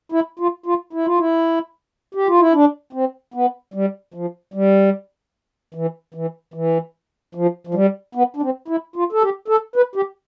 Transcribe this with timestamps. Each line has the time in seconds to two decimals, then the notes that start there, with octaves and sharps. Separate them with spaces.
0.12 E4
0.39 F4
0.66 F4
0.93 E4
1.06 F4
1.19 E4
2.15 G4
2.27 F4
2.40 E4
2.53 D4
2.93 C4
3.34 B3
3.74 G3
4.14 F3
4.54 G3
5.74 E3
6.14 E3
6.54 E3
7.35 F3
7.67 F3
7.74 G3
8.15 B3
8.37 D4
8.42 C4
8.68 E4
8.96 F4
9.12 A4
9.22 G4
9.48 A4
9.76 B4
9.95 G4